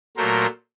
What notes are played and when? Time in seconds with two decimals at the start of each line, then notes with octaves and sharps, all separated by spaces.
0.17 A#2 F#3 A3 A#4 C5